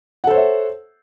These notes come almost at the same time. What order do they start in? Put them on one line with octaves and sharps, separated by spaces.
F#5 A4 C5 C#5 E5